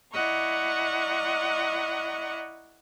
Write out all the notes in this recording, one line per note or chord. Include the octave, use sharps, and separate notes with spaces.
E4 D5 D#5 F#5 A#5 C#6